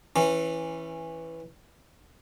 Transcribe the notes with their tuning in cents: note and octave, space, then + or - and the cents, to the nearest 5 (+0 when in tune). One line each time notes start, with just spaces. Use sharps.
E3 +0 C#4 -20